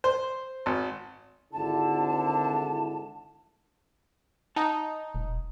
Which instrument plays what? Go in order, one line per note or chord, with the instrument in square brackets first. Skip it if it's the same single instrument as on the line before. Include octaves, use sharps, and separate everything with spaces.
[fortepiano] C5
G#1
[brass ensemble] G#1 D3 E4 [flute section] A5
[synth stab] D#4 [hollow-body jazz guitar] F#5 A5
[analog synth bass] E1